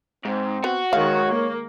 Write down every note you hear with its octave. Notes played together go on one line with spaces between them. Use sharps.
G#2 C4
B3 F#4
D#3 G#3 C#5 F5
A#3